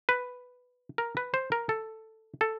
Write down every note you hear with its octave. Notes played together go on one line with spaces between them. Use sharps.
B4
A#4
B4
C5
A#4
A4
A4